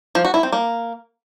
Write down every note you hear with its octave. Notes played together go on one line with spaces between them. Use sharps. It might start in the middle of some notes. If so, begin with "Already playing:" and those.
F3
F#4
E4
C4
A#3